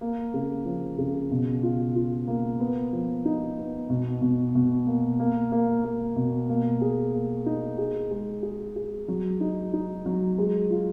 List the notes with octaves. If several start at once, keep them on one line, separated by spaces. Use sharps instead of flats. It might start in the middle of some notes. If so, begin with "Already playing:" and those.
A#3
C#3
F3
C#3
B2
F4
F4
A#3
B3
F3
D#4
B3
B2
B2
B2
A#3
A#3
A#3
A#3
B2
A#3
G#4
A#3
D#4
G#4
G#3
G#4
G#4
F#3
D#4
D#4
F#3
G#3
F4